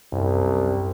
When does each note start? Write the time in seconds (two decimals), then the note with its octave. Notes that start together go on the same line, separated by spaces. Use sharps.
0.13 C2 F#2